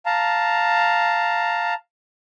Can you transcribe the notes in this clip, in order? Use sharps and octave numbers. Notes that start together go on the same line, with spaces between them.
F5 A5 A#5